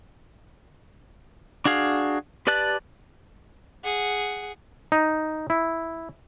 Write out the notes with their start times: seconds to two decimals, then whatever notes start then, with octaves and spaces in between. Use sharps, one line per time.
1.65 D4 F#4 G#4 F5
2.47 G4 B4 D5 A5 F#6
3.84 G#4 F#5
4.92 D#4
5.50 E4